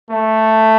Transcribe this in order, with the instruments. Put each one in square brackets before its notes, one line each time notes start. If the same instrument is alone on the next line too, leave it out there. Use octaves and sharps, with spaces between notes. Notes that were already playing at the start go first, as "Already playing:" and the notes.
[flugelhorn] A3